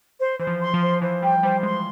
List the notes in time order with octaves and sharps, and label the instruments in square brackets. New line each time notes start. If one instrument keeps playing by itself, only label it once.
[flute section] C5
[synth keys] E3 [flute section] C5
[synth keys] F3
[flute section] C6
[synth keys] F3
[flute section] C5
[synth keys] E3 [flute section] C5
[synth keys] G3 [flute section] G5
[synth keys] G3 [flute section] C5
[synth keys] G#3 [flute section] C6